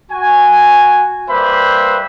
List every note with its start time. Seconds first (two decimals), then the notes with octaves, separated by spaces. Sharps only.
0.12 F#4 G#5
1.30 G3 A#3 B4 C5 E5 B5